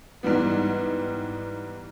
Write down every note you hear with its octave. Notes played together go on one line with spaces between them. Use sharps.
G#2 E3 G3 B3